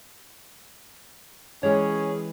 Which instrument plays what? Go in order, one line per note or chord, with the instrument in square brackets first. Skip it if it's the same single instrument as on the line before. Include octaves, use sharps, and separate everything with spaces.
[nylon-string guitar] E3 G#3 G4 [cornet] C#4 [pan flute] G#4 [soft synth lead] C#5